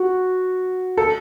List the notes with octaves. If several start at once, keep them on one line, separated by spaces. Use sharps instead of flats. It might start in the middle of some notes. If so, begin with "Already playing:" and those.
Already playing: F#4
A4